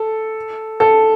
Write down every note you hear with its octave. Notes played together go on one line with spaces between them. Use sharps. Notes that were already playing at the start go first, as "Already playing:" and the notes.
Already playing: A4
A4